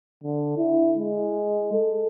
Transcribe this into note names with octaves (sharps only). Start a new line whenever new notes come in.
D3
E4
G#3
A4